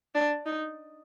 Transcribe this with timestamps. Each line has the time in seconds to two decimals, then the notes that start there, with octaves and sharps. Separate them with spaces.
0.15 D4
0.46 D#4